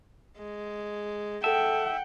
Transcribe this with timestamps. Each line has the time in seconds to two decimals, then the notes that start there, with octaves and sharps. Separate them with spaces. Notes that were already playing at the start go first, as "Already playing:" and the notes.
0.38 G#3
1.44 A4 E5 F#5 G5 A5